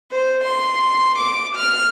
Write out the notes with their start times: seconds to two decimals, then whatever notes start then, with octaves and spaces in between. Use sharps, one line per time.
0.12 C5
0.45 C6
1.19 D6
1.55 F6